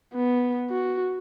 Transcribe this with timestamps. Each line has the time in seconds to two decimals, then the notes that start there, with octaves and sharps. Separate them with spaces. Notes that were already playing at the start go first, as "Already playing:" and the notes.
0.14 B3
0.70 F#4